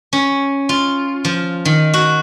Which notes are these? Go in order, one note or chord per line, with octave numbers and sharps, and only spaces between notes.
C#4
F4
F3
D#3
F#4